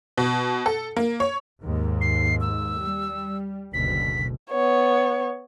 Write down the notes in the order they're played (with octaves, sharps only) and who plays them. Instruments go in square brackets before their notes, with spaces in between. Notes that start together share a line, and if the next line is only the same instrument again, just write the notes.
[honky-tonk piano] B2
A4
A#3
C#5
[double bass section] D#2 G#2
[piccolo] C7
E6
[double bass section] G3
[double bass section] F#1 D2 B2 [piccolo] B6
[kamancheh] B3 C#5